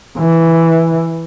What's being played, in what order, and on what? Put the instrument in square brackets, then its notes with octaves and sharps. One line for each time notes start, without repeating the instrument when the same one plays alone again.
[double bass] E3